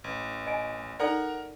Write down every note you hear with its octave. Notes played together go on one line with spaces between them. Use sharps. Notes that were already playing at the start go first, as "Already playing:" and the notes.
A1
D#5 G#5
D#4 A4 A#4 D5 F#5 A#5